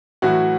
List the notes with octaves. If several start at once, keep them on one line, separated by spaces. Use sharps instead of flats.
A2 E3 F#3 F#4